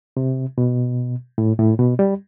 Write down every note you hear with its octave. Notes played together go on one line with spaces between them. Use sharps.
C3
B2
A2
A2
B2
G3